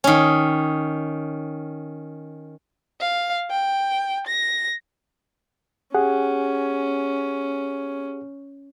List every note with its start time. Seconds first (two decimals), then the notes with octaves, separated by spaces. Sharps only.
0.04 D#3 C#4
3.00 F5
3.51 G5
4.27 A#6
5.95 C#4 G4 G#4 F#5